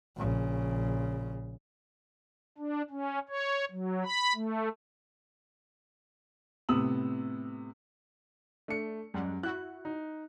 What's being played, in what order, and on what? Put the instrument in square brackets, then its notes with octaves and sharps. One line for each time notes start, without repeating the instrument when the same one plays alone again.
[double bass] A#1 C#3
[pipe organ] D4
C#4
C#5
F#3
B5
A3
[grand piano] A2 C3 B3 D#6 E6 F#7
[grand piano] A3 C#7 [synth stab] D4
[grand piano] F#2 [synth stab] G3 G#3 F#5
[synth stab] E4 F#4 [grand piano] F#6
[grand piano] D#4